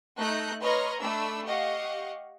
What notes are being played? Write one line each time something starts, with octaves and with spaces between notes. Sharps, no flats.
A3 D#4 F#6 G6 A#6
B4 C#5 D#5 A#5 C6 F6
A3 D4 B5 E6
G4 D#5 F5 F#5 C#6